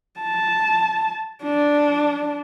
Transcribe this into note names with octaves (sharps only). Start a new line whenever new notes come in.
A5
D4